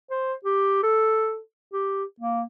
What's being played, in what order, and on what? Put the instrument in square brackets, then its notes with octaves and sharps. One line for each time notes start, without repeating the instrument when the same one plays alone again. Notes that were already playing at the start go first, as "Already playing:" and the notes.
[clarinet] C5
G4
A4
G4
A#3